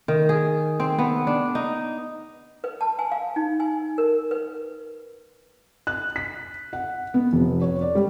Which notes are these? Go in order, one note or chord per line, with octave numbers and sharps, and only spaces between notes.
D#3
G#4
C4
B3
D4
D#4
B4
A5
G#5
F5
D#4
G#5
A#4
B4
F#6
B6
F#5
B3
F1
C#5
D5
G3